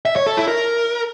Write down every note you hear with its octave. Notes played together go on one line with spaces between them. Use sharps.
E5
C#5
A4
E4
A#4